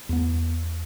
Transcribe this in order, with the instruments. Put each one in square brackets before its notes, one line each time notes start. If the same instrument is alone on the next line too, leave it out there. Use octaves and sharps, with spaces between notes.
[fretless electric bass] E2 B3